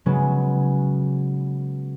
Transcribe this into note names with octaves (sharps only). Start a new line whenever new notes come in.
C#3 F#3 G#3 B3 C#4